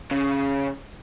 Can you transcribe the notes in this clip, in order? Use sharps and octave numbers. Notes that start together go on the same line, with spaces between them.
C#3